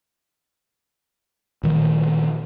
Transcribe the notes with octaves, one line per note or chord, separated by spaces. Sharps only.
A#2 D#3 F3 A3